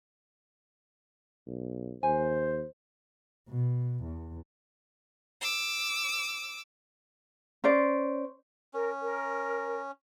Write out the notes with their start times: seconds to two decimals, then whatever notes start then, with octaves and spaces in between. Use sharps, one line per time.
1.47 B1
2.03 D#2 C5 G#5
3.48 B2
4.04 E2
5.41 D6 E6
7.64 C#4 C5 D5
8.73 C#4 A#4
9.01 A#4